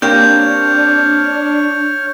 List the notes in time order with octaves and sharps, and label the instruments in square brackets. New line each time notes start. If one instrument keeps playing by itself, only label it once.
[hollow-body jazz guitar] A#3 C4 G4 [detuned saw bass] D4 [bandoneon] C#5 F6 [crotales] G6